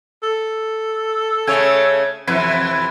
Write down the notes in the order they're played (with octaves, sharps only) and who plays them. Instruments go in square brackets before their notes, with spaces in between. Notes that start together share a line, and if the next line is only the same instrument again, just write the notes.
[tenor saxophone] A4
[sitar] C#3 A3 C#5 [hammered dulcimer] G#5
[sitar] F2 C3 E3 [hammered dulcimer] E4 B4